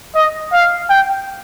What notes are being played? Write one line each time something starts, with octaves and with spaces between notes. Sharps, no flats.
D#5
F5
G5